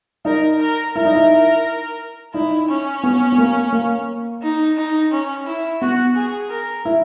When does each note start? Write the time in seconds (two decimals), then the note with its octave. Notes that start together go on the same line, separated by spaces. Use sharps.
0.25 D#4 A#4
0.60 A#4
0.95 E4 A#4
1.05 D#4
1.15 E4
2.34 D#4 E4
2.68 C#4
3.04 B3
3.32 B3
3.38 A#3
3.72 A#3
4.42 D#4
4.77 D#4
5.12 C#4
5.46 E4
5.81 B3 F#4
6.16 G#4
6.50 A#4
6.85 E4